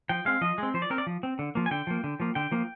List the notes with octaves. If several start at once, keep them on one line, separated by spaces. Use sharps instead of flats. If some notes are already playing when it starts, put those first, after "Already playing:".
F3 G5
G#3 C4 F5
F3 D#5
G#3 C4
F3 C5
D5
C4 A#4
D5
F3
C4
D3
F3 A#3
G#5
D3 G5
F3 A#3
D3
F3 A#3
D3 G5
F3 A#3